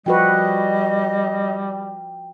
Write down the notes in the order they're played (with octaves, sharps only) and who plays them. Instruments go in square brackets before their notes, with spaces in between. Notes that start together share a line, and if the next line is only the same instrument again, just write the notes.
[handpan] F3 F#4 B4 [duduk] G3 [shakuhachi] D#5 [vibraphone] G5